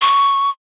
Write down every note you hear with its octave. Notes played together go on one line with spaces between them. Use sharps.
C#6